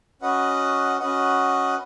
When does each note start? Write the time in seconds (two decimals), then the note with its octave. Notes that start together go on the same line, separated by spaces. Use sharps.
0.22 C#4 F#4 B4 D#5 F#5
0.99 C#4 F#4 B4 D#5 F#5